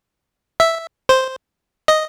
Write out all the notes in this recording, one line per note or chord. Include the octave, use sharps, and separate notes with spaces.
E5
C5
D#5